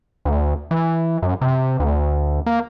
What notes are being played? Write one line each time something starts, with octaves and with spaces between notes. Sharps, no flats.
D2
E3
F#2
C3
D2
A#3